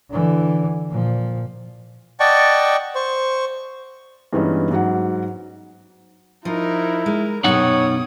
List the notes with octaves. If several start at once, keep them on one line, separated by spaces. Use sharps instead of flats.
D3 E3
A#2 F3
D5 D#5 F#5 G5 A5 C#6
C5 C#6
G2 E3 G#3 B3 C#4 D#4
G#2 F#3 F#5
F3 D#4 E4 A#4
G#3 A#4
F#2 B2 D#4 G4 C#5 F#5 D#6